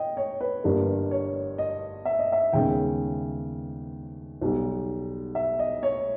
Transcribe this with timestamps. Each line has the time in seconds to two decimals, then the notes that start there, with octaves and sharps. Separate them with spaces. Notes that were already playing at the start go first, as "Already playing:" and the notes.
Already playing: D#5 G5
0.17 C#5
0.41 B4
0.64 G1 G2 G3 A#3
1.11 C#5
1.58 D#5
2.05 E5
2.19 D#5
2.32 E5
2.53 D#2 C#3 G#3 B3 G5
4.41 B1 B2 G3
5.35 E5
5.59 D#5
5.83 C#5